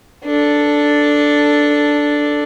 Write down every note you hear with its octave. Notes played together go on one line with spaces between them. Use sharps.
D4 A4